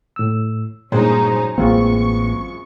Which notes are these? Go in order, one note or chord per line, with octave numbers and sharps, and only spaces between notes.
A2 E6
G2 A#2 F#3 G#3 A#3 C#4 D#4 C5
A1 F#2 G#3 A#3 C4 F4 C#6